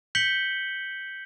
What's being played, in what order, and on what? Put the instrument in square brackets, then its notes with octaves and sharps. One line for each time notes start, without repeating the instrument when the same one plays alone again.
[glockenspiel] G6 B6 C#7 F#7 G7